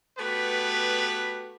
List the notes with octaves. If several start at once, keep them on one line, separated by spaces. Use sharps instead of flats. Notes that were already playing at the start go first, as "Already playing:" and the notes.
A3 B3 F#4 G4 B4